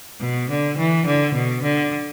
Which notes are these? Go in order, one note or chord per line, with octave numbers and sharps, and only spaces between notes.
B2
D3
E3
D3
B2
D3